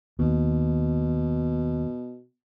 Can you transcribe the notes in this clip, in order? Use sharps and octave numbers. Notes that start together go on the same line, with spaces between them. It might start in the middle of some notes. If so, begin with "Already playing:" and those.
D#2 B2